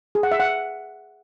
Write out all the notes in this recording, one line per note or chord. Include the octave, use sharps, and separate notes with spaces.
G#4
F#5
E5
F#5